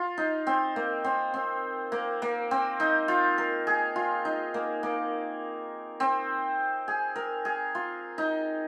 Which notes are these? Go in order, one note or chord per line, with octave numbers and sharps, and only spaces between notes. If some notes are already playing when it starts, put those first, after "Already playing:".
Already playing: F4
D#4
C4
A#3
C4
C4
A#3
A#3
C4
D#4
F4
A#4
G#4
F4
D#4
A#3
A#3
C4
G#4
A#4
G#4
F4
D#4